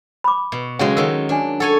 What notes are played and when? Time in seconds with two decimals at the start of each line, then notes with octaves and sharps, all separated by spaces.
0.24 B5 D6
0.52 B2
0.79 C#3 F#3 G#3 C#4 F#4 F#5
0.97 D#3 F#3 E6
1.29 D4 G#4 D5 G#5
1.60 A4 C#5 F#5 G#5